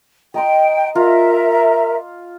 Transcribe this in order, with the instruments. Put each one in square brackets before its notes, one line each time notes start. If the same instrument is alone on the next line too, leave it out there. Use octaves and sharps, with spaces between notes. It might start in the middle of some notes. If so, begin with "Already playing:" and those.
[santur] D#5 A#5 C6 [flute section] G5
[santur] F4 [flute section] A#4 E5 A#5